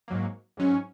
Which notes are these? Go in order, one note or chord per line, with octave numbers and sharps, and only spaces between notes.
G#2 F#3 A#3
G#2 F#3 C#4